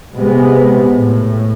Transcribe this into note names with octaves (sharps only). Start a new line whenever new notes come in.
C3 G#3 B3
A2